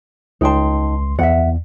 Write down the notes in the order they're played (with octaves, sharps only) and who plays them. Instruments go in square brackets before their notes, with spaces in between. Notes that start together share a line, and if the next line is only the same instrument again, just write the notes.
[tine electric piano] C#2 C6 [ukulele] D#4 G5 A5
[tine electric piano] E2 [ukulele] E5 F#5